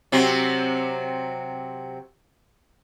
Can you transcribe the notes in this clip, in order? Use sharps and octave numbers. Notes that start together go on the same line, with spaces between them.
C3 F#3 C4